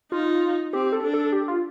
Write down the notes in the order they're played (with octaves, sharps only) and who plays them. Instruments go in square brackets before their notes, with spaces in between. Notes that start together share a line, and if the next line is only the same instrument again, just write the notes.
[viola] D#4 [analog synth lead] F4
[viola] C4 [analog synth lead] G4
[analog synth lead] A4
[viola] D4
[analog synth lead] A4
G4
F4